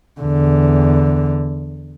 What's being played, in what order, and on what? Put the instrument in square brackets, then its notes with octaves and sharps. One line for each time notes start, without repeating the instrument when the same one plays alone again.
[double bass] E2 D3